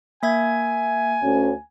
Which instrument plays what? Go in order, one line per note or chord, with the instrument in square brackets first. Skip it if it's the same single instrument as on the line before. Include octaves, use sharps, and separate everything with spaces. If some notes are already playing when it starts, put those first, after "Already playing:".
[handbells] A#3 E5 G#6 [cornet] G#5
[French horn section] D2 C#4